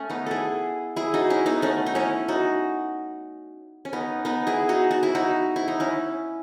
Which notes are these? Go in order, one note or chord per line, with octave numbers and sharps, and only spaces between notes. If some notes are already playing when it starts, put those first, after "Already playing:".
Already playing: A3 C#4
B3 D#4
E4 G#4 A4
E4 G#4
D#4 F#4
C#4 E4
B3 D#4
A3 C#4
D#4
C#4 E4
D#4 F#4
C#4
B3 D#4
B3 D#4
E4 G#4
D#4 F#4
F#4
E4
D#4 F#4
E4
D#4
C#4 E4